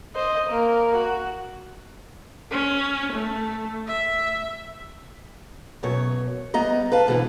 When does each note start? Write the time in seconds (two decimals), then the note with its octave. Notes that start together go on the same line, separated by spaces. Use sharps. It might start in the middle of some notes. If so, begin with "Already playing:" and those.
0.15 C5 D#5
0.49 A#3 A#4
0.95 F#4
2.51 C#4
3.13 A3
3.88 E5
5.83 F#2 B2 C#5
6.54 G3 B3 D#5 A#5
6.92 B4 F5 A5
7.07 G#2 B2 D3 E3